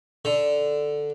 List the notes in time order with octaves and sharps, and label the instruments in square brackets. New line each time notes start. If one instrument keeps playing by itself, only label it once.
[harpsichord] D3